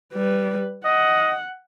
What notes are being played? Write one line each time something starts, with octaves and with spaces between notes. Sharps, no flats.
G3 B4
D#5 F#5